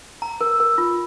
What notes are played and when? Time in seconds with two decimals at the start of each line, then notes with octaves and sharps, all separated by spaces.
0.22 A#5
0.41 A#4
0.60 A#4
0.78 F4